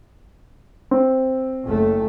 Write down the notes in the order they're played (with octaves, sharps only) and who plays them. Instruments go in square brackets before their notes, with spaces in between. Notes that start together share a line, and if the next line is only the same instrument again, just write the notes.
[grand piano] C4
[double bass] F#1 A3